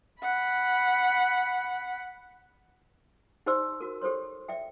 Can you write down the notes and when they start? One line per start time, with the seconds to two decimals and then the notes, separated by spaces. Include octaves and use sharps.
0.22 F#5 B5
3.46 D#4 G4 C5 D5 C6 E6
3.81 F#4 A#4
4.01 G4 A4 C5 C#5 C6
4.48 D5 E5 G5